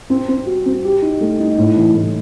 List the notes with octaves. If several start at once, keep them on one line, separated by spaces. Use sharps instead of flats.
C4
C4
F#4
C4
G4
D#4
A3
D#4
A2
E3
A2